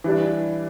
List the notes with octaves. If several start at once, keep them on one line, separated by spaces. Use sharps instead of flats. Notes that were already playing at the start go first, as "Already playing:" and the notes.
E3 G3 D4